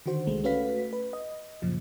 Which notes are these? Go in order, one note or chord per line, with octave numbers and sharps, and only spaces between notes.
D3 D#3 F#4 C5
C2 G#3 A3
A3 C#4 F#4 B4 F5 B6
B4
D#5
F#2 A#2 C#3 F3